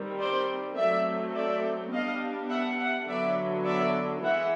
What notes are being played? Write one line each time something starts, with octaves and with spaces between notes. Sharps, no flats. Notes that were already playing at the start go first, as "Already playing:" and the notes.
Already playing: D#3 G3 C4
C5 D5
F#3 A3 C4 D5 E5
D5 E5
G3 B3 D4 D#5 F5
E5 F#5
E5 F#5
D3 F#3 B3 D5 E5
D5 E5
E3 G#3 E5 F#5